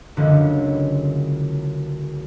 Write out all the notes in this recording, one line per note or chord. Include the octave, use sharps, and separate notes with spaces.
F#1 C#2 D3 G#3